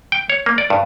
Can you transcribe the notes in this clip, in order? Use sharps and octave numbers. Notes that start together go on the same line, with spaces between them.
G5
C#5
A#3
D5
G2